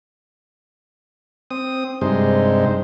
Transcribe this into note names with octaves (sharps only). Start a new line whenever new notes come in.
C4 D#6
G2 C3 G#3 D#4 C5